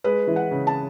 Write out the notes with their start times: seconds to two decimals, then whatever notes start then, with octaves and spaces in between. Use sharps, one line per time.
0.04 G#3 B4
0.27 E3
0.36 F#5
0.51 C#3
0.67 A5